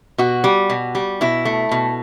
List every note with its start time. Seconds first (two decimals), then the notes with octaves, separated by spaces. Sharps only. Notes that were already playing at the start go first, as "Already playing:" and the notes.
0.18 B2 F#4
0.44 G3
0.70 B2
0.95 G3
1.21 B2 E4
1.45 A3
1.71 B2